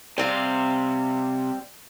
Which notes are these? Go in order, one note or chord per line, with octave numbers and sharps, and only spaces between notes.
C3 G3 C4 F5